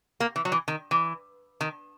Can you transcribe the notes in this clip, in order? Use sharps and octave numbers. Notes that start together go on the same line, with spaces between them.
A#3
E3
F#3
E3
D#3
E3
D#3